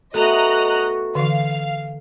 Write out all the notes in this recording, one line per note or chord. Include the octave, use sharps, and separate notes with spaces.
A3 B3 D#4 F#4 A4 D#5 A#5 F#6
D3 E3 F5